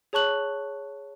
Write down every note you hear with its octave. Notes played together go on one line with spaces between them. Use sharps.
G#4 C#5 A5 C#6 F#6 F#7